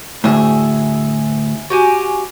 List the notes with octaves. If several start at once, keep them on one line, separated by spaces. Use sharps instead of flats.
D2 A2 G#4 E5
F#4 G4 G#5